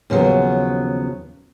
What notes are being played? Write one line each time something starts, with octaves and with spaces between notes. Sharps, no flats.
D#2 C#3 F3 F#3 B3